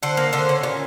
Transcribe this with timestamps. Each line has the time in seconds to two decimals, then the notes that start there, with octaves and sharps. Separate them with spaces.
0.03 D3 C5
0.17 A#3
0.33 D3 C5
0.49 C#4
0.63 A#2